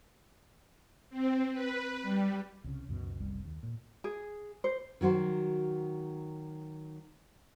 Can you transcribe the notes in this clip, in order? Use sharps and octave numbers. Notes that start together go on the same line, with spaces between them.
C4
B4
G3
C2 C#3
C#2 F#2 B2
F#1 C2 G3
D#2
A#2
G#4
C5
D#3 F#3 F#4 C5